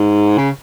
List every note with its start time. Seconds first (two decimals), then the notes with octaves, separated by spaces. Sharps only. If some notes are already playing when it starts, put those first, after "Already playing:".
Already playing: G#2
0.37 C#3